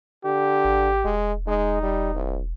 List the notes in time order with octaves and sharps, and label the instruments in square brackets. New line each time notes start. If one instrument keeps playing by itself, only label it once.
[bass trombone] D3 [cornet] G4
[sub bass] G#1
[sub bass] E1 [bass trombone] G#3
[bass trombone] G#3 [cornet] D#4
[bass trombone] G3
C2